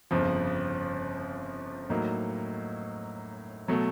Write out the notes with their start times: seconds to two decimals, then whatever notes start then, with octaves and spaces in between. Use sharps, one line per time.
0.11 G1 F2 C#3 F3
1.89 A2 F#3 A#3 D#4
3.68 B2 F#3 A3